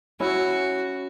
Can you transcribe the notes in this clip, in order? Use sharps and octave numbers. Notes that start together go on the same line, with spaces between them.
C#4 E4 F#4